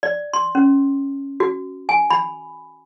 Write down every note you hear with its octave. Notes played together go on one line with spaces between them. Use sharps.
D5
C6
C#4
F#4
G#5
B5